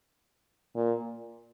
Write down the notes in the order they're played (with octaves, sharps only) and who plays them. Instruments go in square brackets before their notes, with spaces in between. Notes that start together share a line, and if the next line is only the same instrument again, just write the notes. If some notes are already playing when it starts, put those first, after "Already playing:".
[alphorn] A#2